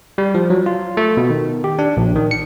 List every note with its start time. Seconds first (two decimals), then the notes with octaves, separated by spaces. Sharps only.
0.18 G3
0.35 F3
0.50 F#3
0.66 F4
0.97 A3
1.17 B2
1.30 D#3
1.64 G4
1.79 D4
1.97 A#1
2.16 D#3
2.31 C#7